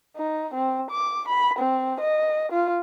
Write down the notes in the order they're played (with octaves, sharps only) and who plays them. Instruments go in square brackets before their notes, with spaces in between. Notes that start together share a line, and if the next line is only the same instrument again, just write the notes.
[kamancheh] D#4
C4
D6
B5
C4
D#5
F4